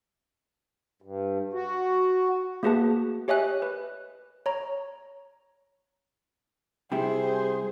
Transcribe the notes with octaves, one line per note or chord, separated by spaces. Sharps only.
G2
F#4
A3 A#3 F#4 G#4 B4 A5
G4 C#5 D#5 E5 G#5 F#6
B4
C#5 A#5
C3 G3 E4 G#4 C5